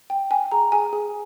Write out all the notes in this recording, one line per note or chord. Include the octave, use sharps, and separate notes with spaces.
G5
G5 G#5
G#4 A#5
G#4 G#5
G#4